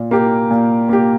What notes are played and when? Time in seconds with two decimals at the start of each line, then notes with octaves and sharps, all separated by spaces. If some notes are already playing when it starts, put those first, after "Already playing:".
Already playing: A#2
0.11 A#3 G4
0.50 A#2
0.89 A#3 G4